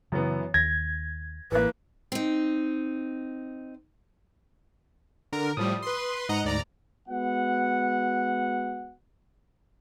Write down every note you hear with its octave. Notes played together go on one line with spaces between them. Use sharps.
F#2 C#3 E3 B3
D#2 G#6 A#6
A1 E3 A#3 B4
C4 D#4
D3 A#4
A2 F3 G3 D#6
B4 C6
G#2 D#5 F#5 A#5
D2 D5 A#5
G#3 B3 F#4 F#5